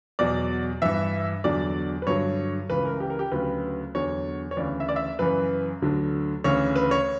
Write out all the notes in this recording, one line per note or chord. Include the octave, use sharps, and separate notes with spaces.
E2 B2 F#3 D5
G2 E3 E5
E2 D3 F#3 D5
B4
G2 D3 F#3 C#5
C#2 C#3 E3 B4
A#4
G4
A#4
G4
D2 C#3 F#3 B4
E2 D3 F#3 C#5
C#5
D2 C#3 E3 D5
E5
D5
E5
F#2 C#3 E3 B4
D2 D3 F#3
D2 C#3 E3 C#5
B4
C#5